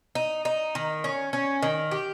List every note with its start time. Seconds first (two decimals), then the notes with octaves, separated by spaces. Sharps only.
0.15 D#4
0.45 D#4
0.75 D#3
1.04 C#4
1.33 C#4
1.62 D#3
1.91 G4